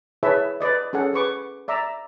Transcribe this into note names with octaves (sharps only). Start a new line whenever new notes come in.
E4 G#4 B4 C#5 E5 A5
B4 D5 D#5
C#4 G#4 A4 F#5
G#4 B4 C#6 D6
D5 E5 A#5 D6 E6